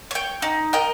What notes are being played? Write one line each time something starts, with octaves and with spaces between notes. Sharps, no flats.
C#5 G5
D#4
A#4 D#5 G5